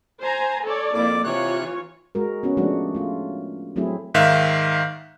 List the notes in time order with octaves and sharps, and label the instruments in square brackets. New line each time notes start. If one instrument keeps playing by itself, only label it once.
[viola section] C5 G#5 A#5
A4 C#5 D5
[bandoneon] F2 D5 D6 [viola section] A#3 E4
[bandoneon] C3 F#6 [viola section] E3 F4 C#5
[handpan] G#3 F#4 A#4
B3 C#4 F#4
F3 G#3 A3 D4 D#4 F#4
A3 F4
F#3 A3 C4 E4 G#4
[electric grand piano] G#2 D#3 E5 F5 F#6